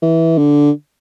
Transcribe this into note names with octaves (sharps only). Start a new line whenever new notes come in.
E3
D3